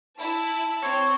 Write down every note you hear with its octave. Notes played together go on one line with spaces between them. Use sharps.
E4 A5
C4 C#5